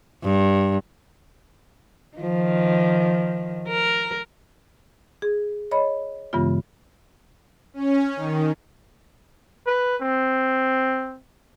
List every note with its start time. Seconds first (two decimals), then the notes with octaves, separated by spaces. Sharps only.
0.24 G2
2.18 D#3 F3
3.68 A#4
5.22 G#4
5.71 C#5 D#5 B5
6.33 G2 C#3 E3 G#3 B3 F4
7.74 C#4
8.16 D#3
9.67 B4
10.02 C4